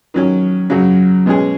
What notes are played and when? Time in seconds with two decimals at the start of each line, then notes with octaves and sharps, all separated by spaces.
0.14 D#3 F#3 C#4
0.70 F#2 C#3 F#3
1.26 B2 G#3 C#4 G#4